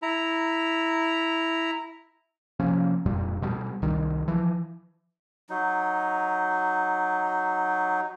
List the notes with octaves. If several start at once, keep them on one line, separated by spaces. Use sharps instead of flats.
E4 A#5
C3 F3 A#3 C#4
E1 F2 A#2 G3
B2 G3
C2 D#3 G3
E3 F3
F#3 D#4